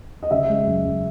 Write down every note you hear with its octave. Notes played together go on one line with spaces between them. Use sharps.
D#5
C#3 E5
G#3
F#2
F#2